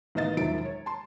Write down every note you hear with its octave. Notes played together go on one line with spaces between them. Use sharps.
A1 D#3 B3 D#5 F5 A6
E1 F#2 D#3 F3 E5 D7
C#5
A5 C6